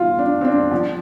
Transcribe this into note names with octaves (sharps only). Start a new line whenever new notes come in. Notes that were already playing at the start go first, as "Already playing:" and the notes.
Already playing: F4
D4
C4
D4
F3